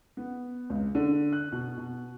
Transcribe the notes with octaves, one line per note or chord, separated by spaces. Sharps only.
B3
C#2
D3
F#6
B2
B2